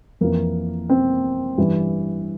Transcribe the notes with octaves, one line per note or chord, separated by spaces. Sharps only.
F2 E3 A#3
C4
G2 E3